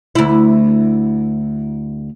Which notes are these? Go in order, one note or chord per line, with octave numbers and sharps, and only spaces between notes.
D2 E4